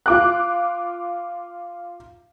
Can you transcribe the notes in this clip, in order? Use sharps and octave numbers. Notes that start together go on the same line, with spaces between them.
F4 D6 F#6